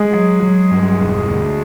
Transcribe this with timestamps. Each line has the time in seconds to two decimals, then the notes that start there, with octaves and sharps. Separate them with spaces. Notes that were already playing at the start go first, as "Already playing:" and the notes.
Already playing: G#3 G#4
0.14 F#3
0.42 F#3
0.71 G2
1.00 E1
1.29 D2